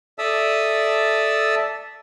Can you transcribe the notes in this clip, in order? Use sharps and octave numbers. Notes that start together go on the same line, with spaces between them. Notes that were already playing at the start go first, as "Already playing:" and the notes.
A4 D5 E5 A5 D#6 E6